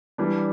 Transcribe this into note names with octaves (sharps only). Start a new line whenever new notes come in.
E3 G3 D4